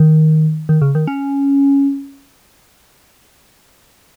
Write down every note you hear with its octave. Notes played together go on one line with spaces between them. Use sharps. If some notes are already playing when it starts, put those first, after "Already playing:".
Already playing: D#3
D#3
C#3
D#3
C#4